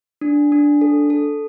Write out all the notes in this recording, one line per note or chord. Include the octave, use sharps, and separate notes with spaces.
D4
D4
A4
A4